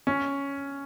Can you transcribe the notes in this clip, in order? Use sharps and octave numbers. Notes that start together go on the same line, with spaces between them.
C#4